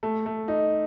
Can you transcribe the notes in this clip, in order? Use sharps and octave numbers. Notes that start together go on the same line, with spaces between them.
A3
A3
D#4